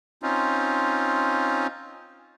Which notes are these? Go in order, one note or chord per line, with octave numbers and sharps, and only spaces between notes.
C4 C#4 D#4 F4